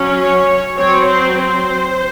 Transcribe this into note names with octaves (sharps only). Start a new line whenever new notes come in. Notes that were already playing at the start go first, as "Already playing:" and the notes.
Already playing: F#3 C#4
C#5
F#3 C4 C#5
C5
C5